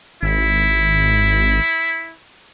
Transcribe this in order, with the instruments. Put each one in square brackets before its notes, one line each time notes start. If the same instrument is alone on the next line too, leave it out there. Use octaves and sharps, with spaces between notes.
[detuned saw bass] G#1 [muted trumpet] E4